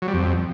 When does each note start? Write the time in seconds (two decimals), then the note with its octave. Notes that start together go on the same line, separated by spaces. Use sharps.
0.02 F#3
0.08 G3
0.14 F2